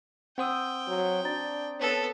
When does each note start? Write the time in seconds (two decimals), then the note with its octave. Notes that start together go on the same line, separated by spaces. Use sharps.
0.38 C4 C5 F#5 G5 D#6 E6
0.88 F#3
1.25 D4 A#5 A6
1.80 B3 A4 C#5 A5 A6